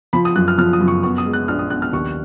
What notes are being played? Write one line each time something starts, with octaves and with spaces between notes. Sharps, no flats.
F3 B5
D#6
F#2 F#6
F6
F3 F6
D#6
F#2
C#6
B3 C#6
D#6
G#3
F#6
A#1 F6
D#6
B3 F#6
F6
D#2 C#6